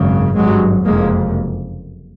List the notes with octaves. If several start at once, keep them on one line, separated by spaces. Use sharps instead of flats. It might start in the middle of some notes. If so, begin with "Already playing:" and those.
Already playing: G#1 F#2 C#3
G#1 G2 F#3 G#3
F#1 F2 C3 G#3 A#3